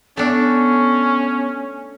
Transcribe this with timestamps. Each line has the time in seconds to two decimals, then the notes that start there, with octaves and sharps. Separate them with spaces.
0.17 A3 B3 C#4 D4